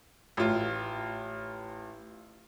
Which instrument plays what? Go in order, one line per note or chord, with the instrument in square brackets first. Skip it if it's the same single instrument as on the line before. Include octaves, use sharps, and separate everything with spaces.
[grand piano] A1 F4